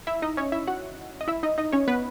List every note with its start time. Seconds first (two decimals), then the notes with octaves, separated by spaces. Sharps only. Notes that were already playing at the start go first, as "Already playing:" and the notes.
0.07 E4 E5
0.22 D#4 D#5
0.37 C#4 C#5
0.52 E4 E5
0.67 F#4 F#5
1.21 D#5
1.28 E4 E5
1.43 D#4 D#5
1.58 D#4 D#5
1.72 C#4 C#5
1.88 B3 B4